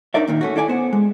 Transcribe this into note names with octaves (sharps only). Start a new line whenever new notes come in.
D4 D#4 A#4 C#5 D5 E5
D#2 A#2 D#3
A3 C#4 F#4
E4 A4 D5 G#5
B3 C5 F#5
G#3